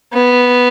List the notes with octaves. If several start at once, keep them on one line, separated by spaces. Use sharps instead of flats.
B3